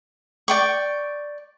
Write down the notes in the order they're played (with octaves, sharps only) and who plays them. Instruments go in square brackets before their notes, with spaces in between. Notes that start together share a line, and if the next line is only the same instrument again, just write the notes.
[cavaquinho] D5 G5 C#6